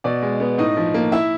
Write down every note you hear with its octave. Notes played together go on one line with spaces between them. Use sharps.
B2 D5
G#3
B3
A2 D#4 D#5
F3
A#3
E4 E5